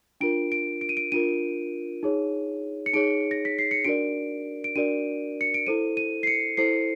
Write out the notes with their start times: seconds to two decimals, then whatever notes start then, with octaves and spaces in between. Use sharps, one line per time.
0.21 D4 F4 A#4 D7
0.52 D7
0.81 D7
0.89 D#7
0.97 D7
1.12 D4 F4 A#4 D#7
2.03 D#4 G#4 C#5
2.86 C#7
2.93 D#4 G#4 C#5 D7
3.31 A#6
3.45 B6
3.59 C7
3.71 C#7
3.84 D4 F#4 A#4 D5 D7
4.64 D7
4.75 D4 F#4 A#4 D5 D#7
5.41 C#7
5.54 D7
5.67 E4 A4 C5 D#7
5.97 D#7
6.23 C7
6.27 C#7
6.57 E4 A4 C5 C7